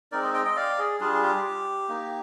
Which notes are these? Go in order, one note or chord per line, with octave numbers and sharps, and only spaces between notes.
G#3 C4 D#4 A#4 D5
C5 D#5
D#5 G5
D#5 G5
D5 F5
G#4
G3 D4 F4 G#4
G#4
G4
A#3 D#4